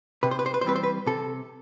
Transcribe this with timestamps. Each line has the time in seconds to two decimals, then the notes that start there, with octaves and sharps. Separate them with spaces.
0.23 C3 B4
0.31 C5
0.39 B4
0.46 C5
0.54 B4
0.61 C5
0.64 E3 G3 C4 B4
0.76 C5
0.84 B4
1.06 C3 A4